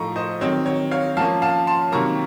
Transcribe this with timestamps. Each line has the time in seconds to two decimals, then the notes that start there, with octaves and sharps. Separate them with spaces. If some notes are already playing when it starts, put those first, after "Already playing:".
Already playing: A2 F3 A3 D#4 A#5 C#6
0.16 C5 D#5
0.41 D#3 F#3 C4 D#4 C#5
0.66 C#5
0.91 C#5 F5
1.17 F3 A#3 C#4 F5 A5
1.42 F5 A5
1.67 A5 C6
1.92 C3 D#3 F#3 A#3 A#5 C#6